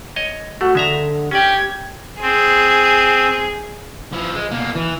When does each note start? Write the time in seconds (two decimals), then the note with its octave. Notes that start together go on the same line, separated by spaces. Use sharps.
0.16 C#5 D#5
0.61 A3 F#4
0.75 D3 G#3 E5 A#5
1.31 C#4 G4 D5 G#6
2.22 C4 G#4
4.13 F3 E4
4.35 G#3
4.51 B2 A#3
4.75 E3